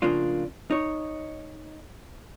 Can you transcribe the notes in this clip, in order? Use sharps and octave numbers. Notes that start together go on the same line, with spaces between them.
A2 C#3 F3 A#3 D4 F4
D#4 C#5